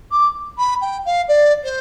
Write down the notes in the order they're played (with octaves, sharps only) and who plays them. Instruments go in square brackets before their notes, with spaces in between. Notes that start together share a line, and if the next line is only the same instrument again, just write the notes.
[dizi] D6
B5
G5
F5
D5
C5